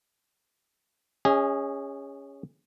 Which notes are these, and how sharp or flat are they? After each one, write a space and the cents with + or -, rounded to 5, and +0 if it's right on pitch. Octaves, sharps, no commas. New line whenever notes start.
C#4 +5 G#4 -25 D#5 +30